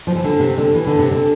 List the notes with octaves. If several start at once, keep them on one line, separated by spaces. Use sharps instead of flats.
F3
E3
D3
C3
D3
E3
D3
C3
D3